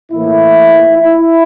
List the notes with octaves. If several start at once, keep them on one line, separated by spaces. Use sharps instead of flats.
A2 E3 A#3 E4
E4